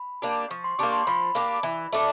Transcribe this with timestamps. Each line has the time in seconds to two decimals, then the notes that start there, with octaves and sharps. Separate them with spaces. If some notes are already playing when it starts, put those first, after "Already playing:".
Already playing: B5
0.22 A#3 D4 G4
0.51 F3 C#6
0.64 C6
0.79 A#3 D4 G4 C#6
0.93 C6
1.07 F3 B5
1.35 A#3 D4 G4
1.63 E3
1.93 A3 D4